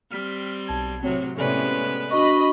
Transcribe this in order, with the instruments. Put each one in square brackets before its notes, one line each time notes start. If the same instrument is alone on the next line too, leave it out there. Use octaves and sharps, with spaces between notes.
[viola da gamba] G3 C4 [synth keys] F6 B6
[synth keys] B1 A5 G#6
[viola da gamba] A2 C3 F#3 [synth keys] C4 C#5
[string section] A2 C3 C#4 [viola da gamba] G#3 B3 B4 [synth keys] A4 D5
[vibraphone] D4 F#4 C#6 [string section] D#5 B5